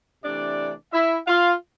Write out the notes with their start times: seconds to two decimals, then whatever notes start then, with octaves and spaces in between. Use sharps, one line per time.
0.24 C3 E3 A3 D4 D5
0.93 E4 E5
1.27 F4 F5